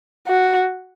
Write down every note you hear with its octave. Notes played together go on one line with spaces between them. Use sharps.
F#4